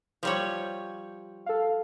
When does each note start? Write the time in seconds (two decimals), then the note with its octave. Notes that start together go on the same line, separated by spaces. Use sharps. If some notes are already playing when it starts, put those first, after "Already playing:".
0.23 F3 G3 C#5
1.46 A4 F5